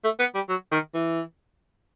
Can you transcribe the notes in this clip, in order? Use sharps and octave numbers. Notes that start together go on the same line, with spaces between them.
A3
B3
G3
F#3
D#3
E3